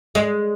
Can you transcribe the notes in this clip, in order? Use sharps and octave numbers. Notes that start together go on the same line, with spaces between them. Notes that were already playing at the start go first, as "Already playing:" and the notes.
G#3